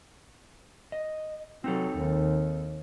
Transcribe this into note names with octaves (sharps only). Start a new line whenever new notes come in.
D#5
F#3 C4 D#4 A4
D#2